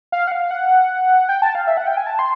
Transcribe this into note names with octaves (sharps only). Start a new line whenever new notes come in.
F5
F#5
F5
F#5
G5
A5
F5
E5
F#5
G5
G#5
A5
C6